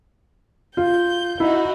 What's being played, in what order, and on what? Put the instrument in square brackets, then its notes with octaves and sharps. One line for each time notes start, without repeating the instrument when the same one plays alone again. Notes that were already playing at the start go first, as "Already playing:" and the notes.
[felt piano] F4 [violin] G6
[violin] D#4 F#4 [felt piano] E4